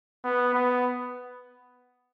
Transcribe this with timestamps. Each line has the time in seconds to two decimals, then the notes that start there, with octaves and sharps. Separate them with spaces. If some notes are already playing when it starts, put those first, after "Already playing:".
0.24 B3
0.54 B3